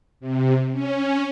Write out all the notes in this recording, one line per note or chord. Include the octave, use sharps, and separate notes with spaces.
C3
C#4